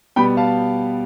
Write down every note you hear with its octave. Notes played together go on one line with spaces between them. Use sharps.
B2 G3 B3 G5 B5
F5 A5